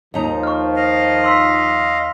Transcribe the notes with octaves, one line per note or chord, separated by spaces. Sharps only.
D#2 D#3 F3 D#4 A#5
C#6 F6
D#5 F5
C6 E6 B6